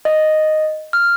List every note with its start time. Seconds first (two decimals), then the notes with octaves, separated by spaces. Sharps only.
0.05 D#5
0.93 F6